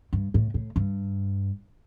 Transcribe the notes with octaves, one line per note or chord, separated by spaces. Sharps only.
G2
A2
A2
G2